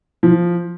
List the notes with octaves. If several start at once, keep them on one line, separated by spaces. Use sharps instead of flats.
F3